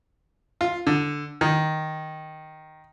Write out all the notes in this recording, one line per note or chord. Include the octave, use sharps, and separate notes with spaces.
F4
D3
D#3